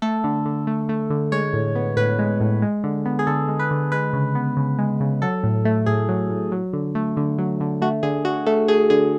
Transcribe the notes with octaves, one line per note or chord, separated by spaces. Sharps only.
A3 A4
D3
D3
A3
A3
D3
G#3 C#5
A2
B3
A2 B4
G#3
A2
G#3
D3
B3
G#4
D3 A4
G#3
B4
D3
G#3 B4
C#3
B3
C#3
G#3
C#3
F#3 A4
A2
A3
A2 G#4
F#3
A2
F#3
D3
A3
D3
F#3
D3
A3 F#4
D3 G#4
D3 F#4
A3 A4
A3 G#4
D3 G#4